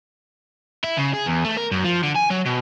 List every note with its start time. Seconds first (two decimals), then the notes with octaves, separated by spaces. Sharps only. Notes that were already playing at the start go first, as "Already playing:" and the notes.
0.84 E4
0.97 C#3
1.13 G#4
1.26 E2
1.44 A3
1.57 A#4
1.71 F#2
1.84 F3
2.03 D3
2.16 G#5
2.30 F#3
2.46 B2